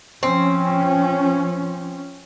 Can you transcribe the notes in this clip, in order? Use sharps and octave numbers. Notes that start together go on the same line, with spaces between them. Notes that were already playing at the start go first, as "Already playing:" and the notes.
F3 C4 C#4